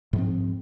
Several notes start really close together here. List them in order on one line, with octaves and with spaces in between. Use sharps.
G#2 F3 C4